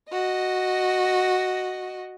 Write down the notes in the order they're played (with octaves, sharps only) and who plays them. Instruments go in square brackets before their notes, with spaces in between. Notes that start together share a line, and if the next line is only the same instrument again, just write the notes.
[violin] F#4 D#5